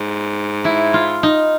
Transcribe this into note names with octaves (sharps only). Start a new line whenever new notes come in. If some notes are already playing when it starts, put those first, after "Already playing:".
Already playing: G#2
E4
F4
D#4